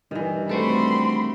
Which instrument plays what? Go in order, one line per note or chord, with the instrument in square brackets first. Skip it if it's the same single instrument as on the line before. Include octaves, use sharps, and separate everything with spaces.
[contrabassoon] G2 [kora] D#3 E3
[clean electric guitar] A3 C4 F#4 [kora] A4 B4 [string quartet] B5 C6